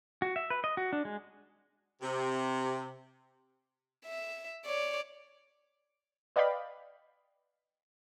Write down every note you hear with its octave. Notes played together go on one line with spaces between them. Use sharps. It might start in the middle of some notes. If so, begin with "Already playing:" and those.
F#4
E5
B4
D#5
F#4
D4
G#3
C3
E5
C#5 D5
B4 D5 D#5 F5 G5 B5